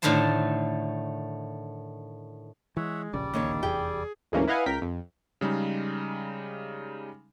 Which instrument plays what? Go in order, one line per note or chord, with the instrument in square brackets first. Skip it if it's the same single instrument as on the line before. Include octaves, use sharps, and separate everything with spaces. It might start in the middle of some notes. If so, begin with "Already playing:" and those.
[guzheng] A2 D3 D#3 A3 C5 A5
[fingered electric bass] E3 [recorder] G#3 [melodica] C#5 E5 F#5
[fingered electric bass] D1 A#1 C#3 [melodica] G3 D5
[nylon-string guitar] D#2 D#3 D4 [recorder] C#5
[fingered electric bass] F1 E2 [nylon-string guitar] G4 G5 [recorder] G#4
[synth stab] D2 G#2 E3 A#3 C#4
E4 B4 D#5 F5 F#5 G#5
C#2 A#4 G5 B6
F2
[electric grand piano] C#3 G3 G#3 D#4